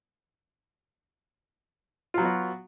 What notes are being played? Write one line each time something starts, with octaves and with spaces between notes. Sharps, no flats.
F#3 B3 F4 F#4